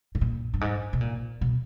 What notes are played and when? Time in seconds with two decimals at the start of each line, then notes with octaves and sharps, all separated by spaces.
0.15 A2
0.21 A#2
0.54 G2
0.61 G#2
0.93 B2
1.01 A#2
1.41 B2